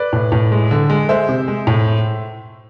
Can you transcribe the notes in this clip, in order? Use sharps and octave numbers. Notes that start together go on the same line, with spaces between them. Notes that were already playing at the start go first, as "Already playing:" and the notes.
Already playing: B4 D5
A2
A2
G#3
D3
G#3
G#3 C5 E5
C3
G#3
A2